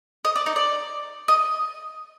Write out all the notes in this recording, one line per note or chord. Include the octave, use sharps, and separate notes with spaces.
D#5
D5
D#4
D5
D#5